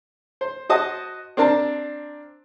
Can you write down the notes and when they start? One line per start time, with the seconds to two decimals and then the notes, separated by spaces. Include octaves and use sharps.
0.41 C5
0.69 F#4 C5 D#5 A5 D#6
1.37 C4 D4 A#4 A5